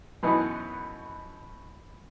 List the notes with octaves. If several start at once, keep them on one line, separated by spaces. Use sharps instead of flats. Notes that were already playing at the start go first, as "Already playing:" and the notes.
F#2 B2 E3 B3 D#4 F#4